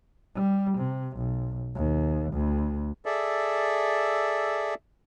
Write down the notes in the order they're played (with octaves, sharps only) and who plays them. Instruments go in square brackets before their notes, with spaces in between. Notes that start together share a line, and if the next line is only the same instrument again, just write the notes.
[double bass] G3
C3
B1
D#2
D2
[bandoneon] G#4 A4 D5 E5